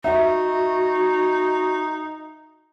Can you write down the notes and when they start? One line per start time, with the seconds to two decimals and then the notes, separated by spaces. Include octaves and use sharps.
0.04 D#4 F#4 E5